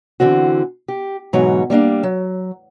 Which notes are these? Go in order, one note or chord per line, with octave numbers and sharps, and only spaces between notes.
D3 E3 C4 F#4
G4
G#2 B2 E3 F#3 C#5 A#5
G3 A#3 D4 F5
F#3